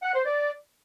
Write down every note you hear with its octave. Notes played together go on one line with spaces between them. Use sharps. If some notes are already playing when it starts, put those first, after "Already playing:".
F#5
C5
D5